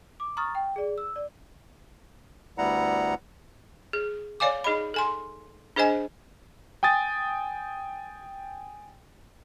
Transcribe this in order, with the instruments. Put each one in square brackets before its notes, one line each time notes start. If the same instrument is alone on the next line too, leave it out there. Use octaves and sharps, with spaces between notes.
[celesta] D6
A#5 C#6 D#6 F6 A6
G5
G#4 D5
E6
D5
[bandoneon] D2 G3 B3 E4 F#5 A#5
[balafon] G#4
C#5 D5 F5 G#5 D6
D#4 G#4 D#5 B5
A4 G#5 C6
D4 G#4 C5 D#5 G#5
[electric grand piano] G5 G#5 D#6 A6